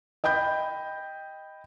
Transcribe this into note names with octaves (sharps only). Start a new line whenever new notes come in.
D#5 G5 B5 G6